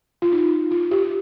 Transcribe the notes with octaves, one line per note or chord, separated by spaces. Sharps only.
F4
D#4
F4
G4